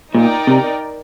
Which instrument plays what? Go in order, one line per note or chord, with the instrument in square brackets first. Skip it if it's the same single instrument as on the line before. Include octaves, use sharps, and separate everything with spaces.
[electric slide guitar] A#2 [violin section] D#4 A#4 D5 G5
[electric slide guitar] C3